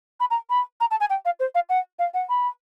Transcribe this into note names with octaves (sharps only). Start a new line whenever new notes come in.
B5
A#5
B5
A#5
A5
G#5
G5
F5
C5
F5
F#5
F5
F#5
B5